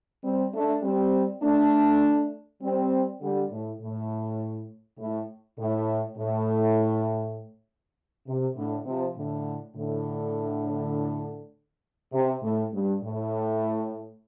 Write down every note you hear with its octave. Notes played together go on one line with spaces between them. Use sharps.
G3 C4
A3 D4
G3 C4
A3 D4
G3 C4
D3 G3
A2
A2
A2
A2
A2
C3
A2 D3
C3 F3
A2 D3
A2 D3
C3
A2
G2
A2